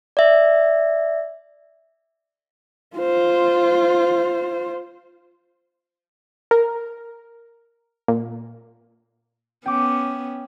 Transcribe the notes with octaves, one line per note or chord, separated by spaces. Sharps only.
D5 E5
F4 C5
A#4
A#2
B3 C#4 G5 D6